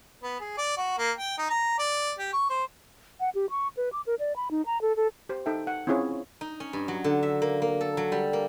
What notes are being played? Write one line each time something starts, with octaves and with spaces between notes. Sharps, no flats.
B3
G#4
D5
F#4
A#3
G5
D#4
A#5
D5
G4
C#6
C5
F#5
G4
C#6
B4
D6
A#4
D5
B5
D#4
A#5
A4
A4
G4 C5
D#4 A4 E5 G5
F#5
C4 C#4 E4 F4 G#4 C#5
D#4
C#4
G2
F#3
D3
E5
A#3
A#3
A4
F#3
G3
A#3